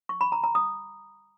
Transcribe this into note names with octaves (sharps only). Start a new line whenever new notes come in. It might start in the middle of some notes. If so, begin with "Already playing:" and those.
C#6
B5
A#5
A#5
D#6